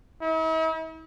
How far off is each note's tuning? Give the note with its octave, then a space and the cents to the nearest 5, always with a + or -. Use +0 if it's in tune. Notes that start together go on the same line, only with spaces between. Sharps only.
E4 -45